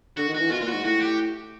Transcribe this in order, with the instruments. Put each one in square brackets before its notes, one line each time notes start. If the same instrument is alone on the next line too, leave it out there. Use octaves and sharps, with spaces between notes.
[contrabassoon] D3 [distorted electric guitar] F#4
[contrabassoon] D#3
[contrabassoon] E3 [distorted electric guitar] F#4
[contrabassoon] B2 [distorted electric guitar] F4
[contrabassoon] A#2 [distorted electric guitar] F4
[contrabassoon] G#2 [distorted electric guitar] F#4
[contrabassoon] A2 [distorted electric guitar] F#4
[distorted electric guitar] G4